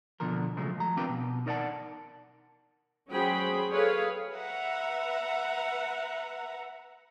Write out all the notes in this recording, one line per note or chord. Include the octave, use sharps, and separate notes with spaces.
B2 D3 F3 A#4
C#3 F3 F#3 G#3 A3
F3 A#5
C4 D4 F4 G4 A#4 B4
B2
D#4 A#4 D5 E5 F#5 A5
F#3 C#4 G#4 C5 G5 B5
G#4 A4 B4 C#5 F5
B4 E5 F#5 A#5